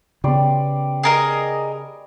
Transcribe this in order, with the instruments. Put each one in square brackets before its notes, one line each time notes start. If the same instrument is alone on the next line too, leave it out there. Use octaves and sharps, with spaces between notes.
[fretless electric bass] C#3 B3 [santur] G3 D5 C6
[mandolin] G#4 A#4 D#5